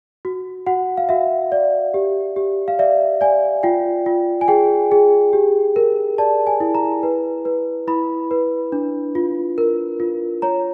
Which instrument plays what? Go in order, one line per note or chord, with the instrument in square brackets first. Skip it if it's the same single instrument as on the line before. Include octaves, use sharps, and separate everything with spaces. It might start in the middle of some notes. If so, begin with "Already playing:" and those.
[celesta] F#4
F#4 F#5
F5
F#4 E5
D5
G4
G4
F5
D5 E5
D5 G#5
F4 G5
F4
G#5
G#4 G5
G#4
G4
A#4
D5 A5
G#5
E4
A#5
B4
B4
E4 B5
B4
D4
F4
A#4
F4
C#5 A#5